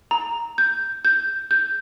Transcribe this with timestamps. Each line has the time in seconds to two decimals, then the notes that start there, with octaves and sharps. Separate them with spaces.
0.11 A#5
0.58 G6
1.05 G6
1.51 G6